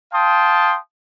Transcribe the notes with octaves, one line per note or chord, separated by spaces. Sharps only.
F5 G5 A5 C6 D#6